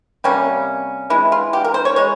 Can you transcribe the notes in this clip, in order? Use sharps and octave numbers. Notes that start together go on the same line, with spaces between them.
C3 G3 A#3 C#4
E3 G#3 E4
F4
G4
A#4
C5
C#5
E3 G#3 C#5